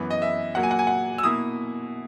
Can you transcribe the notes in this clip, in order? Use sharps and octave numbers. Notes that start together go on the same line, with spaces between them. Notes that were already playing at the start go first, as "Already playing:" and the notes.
Already playing: F#2 E3 B3
D#5
E5
A#2 F#3 A#3 F#5
G#5
F#5
G#5
F#5
E6
B2 A#3 E4 D#6